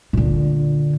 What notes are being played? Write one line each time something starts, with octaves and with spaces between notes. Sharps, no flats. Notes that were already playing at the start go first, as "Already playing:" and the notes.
A#2 D3